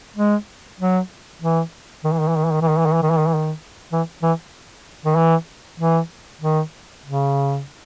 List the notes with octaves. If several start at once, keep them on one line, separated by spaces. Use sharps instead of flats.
G#3
F#3
E3
D#3
E3
D#3
E3
D#3
E3
D#3
E3
D#3
E3
D#3
E3
D#3
E3
D#3
E3
D#3
E3
E3
D#3
E3
E3
D#3
C#3